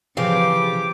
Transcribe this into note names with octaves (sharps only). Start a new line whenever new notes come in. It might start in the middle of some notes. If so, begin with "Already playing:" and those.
C#3 E3 F3 C4 G4 F5 D6